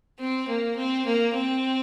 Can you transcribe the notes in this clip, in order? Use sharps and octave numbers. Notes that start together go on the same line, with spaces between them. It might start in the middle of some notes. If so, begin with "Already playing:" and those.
C4
A#3
C4
A#3
C4